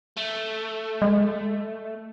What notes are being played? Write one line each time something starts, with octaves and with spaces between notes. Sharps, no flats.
A3
G#3 D#5